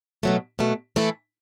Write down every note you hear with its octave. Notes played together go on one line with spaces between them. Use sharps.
B2 F#3 A3
B2 F#3 A3
E3 A3 E4 A4